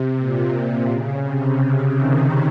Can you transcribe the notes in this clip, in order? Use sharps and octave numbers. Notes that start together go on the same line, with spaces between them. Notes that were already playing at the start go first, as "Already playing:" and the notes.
Already playing: C3
A#2
C#3
C3
C#3
C3 D#3